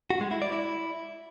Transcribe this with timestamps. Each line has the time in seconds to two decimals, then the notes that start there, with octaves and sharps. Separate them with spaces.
0.10 F#4
0.21 G#3
0.31 E4
0.42 D5
0.52 E4